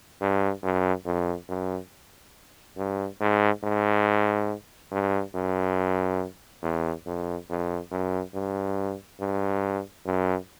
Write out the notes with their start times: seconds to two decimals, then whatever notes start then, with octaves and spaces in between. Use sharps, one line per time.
0.21 G2
0.63 F#2
1.06 F2
1.49 F#2
2.77 G2
3.21 G#2
3.63 G#2
4.92 G2
5.35 F#2
6.62 E2
7.06 F2
7.49 F2
7.91 F#2
8.34 G2
9.20 G2
10.06 F#2